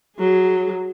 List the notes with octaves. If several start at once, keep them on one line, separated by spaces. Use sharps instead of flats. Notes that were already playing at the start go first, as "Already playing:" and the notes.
F#3 G#4